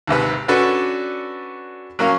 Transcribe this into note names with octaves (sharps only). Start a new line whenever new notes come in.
D#2 G#2 C3 B4
C#4 D4 F#4 A4 B4 D5
F#3 A#3 C#4 F5